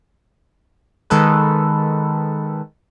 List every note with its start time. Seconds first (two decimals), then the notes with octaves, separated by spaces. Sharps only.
1.10 D#3 G#3 A4 B4